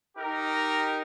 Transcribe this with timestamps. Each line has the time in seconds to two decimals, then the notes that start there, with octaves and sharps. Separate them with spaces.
0.16 D#4 G4 A#4